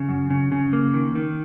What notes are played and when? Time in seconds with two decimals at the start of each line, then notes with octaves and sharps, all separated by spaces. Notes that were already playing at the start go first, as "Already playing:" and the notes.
Already playing: C#3
0.09 F#2
0.30 C#3
0.52 C#3
0.73 A#3
0.94 D#3
1.15 D#3